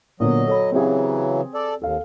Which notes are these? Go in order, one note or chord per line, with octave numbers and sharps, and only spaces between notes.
A#2 D3 F#3 B3 D#5
A4 C#5 B5
C#3 E3 F#3 C4 G4 G#4
A4 D5
D#2 A4 F5